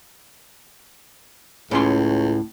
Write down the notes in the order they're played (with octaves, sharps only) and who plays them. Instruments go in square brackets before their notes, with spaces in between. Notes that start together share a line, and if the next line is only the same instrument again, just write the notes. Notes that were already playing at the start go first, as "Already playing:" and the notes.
[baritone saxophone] C#2 [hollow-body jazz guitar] A2 C#4 C6